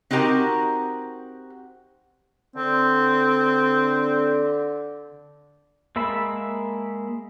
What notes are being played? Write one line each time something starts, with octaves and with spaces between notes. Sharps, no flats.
C4 D#4 F#4 G4 A#4 A5
D3 C4
G#3 A#3 E5 A5 B5